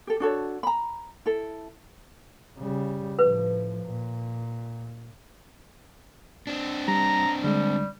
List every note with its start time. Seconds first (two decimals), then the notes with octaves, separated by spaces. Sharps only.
0.07 G4 A4
0.20 D4 F#4 A4 C#5
0.63 A#5 B5
1.26 E4 A4
2.58 C#3 G3
3.19 A2 F3 B4
3.85 A#2
6.47 C4 D4
6.88 G3 A#5
7.44 D3 G3 G#3